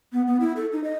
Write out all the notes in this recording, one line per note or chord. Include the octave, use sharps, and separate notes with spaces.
B3
B3
E4
A4
D#4
D#5